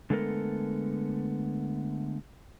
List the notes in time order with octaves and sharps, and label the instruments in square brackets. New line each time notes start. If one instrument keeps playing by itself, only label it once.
[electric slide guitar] D3 G#3 A3 B3 A4 A#4